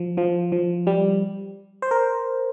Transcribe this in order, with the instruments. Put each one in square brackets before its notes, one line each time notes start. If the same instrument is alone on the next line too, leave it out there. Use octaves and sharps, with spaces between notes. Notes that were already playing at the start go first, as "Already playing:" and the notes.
Already playing: [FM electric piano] F3
F3
F3
G3
C5
A#4